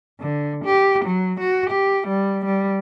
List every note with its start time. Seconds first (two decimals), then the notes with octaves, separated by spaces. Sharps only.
0.20 D3
0.65 G4
1.05 F#3
1.40 F#4
1.70 G4
2.07 G3
2.45 G3